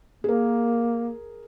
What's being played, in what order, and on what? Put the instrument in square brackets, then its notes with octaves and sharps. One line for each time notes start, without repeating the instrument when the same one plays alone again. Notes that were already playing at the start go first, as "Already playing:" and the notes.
[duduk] A#3 [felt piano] G#4 A#4